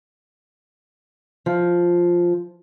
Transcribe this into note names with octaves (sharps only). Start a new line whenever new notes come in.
F3